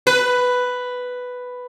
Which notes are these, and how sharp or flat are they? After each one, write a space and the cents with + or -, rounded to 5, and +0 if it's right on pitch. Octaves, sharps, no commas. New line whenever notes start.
B4 +5